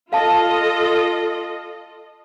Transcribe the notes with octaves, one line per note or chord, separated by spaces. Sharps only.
F4 A4 D#5 F5 A5